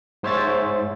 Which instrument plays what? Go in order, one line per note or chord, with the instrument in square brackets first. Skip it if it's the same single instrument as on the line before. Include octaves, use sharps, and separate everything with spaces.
[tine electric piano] G#2 C5 C#5 E5 A6